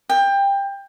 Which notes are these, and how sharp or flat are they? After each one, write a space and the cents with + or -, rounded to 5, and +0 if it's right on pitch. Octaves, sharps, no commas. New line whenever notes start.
G5 +20